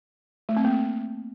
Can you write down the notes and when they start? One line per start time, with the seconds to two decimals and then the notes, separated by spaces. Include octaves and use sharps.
0.49 A3
0.57 C4
0.64 A#3